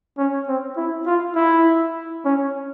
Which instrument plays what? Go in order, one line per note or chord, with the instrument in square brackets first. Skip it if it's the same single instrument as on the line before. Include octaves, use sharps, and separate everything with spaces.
[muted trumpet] C#4
C4
E4
F4
E4
C#4